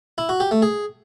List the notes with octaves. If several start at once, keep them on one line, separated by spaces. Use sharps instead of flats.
E4
F#4
G4
A3
G#4